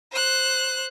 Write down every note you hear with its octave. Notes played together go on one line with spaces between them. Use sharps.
C5 F#6